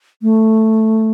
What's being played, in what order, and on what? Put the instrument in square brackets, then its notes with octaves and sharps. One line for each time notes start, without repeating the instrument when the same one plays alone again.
[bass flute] A3